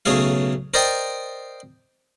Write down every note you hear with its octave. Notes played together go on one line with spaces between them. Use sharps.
B1 C#3 A3 G#4 F5
A#4 C5 D5 D#5 G5